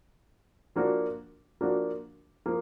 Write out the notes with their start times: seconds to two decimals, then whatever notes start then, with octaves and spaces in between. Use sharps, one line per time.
0.76 F3 A#3 D4 F#4
1.61 F3 A#3 D4 F#4
2.46 F3 A#3